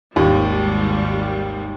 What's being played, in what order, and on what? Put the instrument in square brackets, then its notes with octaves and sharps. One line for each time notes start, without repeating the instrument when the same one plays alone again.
[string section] G#1 G#2 G3 [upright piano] D#2 D#3